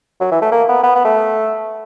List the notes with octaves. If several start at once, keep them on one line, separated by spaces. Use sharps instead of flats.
F#3
E3
A3
A#3
B3
B3
B3
A3